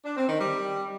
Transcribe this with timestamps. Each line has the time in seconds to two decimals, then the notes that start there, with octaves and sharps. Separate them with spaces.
0.05 D4
0.17 C4
0.29 D#3
0.40 G3